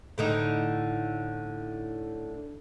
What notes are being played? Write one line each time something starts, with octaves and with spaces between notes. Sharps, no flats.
A2 D3 D#4